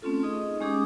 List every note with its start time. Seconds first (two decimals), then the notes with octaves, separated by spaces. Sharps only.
0.02 A3 C4 C#4 F4 A4
0.23 D#4 G#4 D#5
0.60 G#3 C#4 G4 G#4 D6 D#6